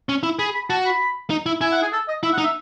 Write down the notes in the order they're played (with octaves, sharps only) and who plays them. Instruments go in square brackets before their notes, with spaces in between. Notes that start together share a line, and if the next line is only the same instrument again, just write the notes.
[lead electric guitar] C#4
E4
[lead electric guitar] G#4 [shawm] B5
[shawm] B5
[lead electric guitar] F#4 [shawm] A5
[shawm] B5
[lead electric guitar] D#4
E4
[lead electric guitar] E4 [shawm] G#5
[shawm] F#5
G#4
A4
D#5
[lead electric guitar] E4 [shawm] E5
[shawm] F#5
[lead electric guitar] D#4
[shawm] E5